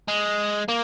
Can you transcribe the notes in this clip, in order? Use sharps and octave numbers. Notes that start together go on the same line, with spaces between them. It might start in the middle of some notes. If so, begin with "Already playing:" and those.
G#3
A#3